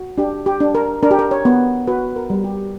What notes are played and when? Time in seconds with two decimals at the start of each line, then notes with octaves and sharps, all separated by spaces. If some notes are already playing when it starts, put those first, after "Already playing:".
Already playing: F#4
0.18 D4 G4
0.46 G4
0.60 D4
0.75 A#4
1.03 D4 A#4
1.11 G4
1.19 A#4
1.31 C#5
1.45 B3
1.87 F#4 B4
2.16 A#4
2.30 G3
2.44 G4